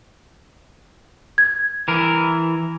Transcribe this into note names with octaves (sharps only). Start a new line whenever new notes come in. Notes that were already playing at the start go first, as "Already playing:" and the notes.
G#6
E3 A#4